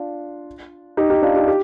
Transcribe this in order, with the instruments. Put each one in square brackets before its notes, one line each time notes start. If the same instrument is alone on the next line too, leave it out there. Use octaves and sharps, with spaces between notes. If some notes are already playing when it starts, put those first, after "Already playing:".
Already playing: [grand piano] D4 F4
D#4 G4
D#4 G4
D4 F4
D#4 G4
G4